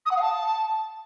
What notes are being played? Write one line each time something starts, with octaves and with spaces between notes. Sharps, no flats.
D#6
F#5
F5
A5